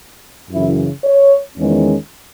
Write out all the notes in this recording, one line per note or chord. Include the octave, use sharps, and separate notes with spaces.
F#2 C#3 E3 E4
C#5
E2 D#3 G#3 C#4